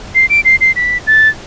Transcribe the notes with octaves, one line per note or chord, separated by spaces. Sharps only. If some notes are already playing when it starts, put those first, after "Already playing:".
C7
D7
C7
C7
B6
A6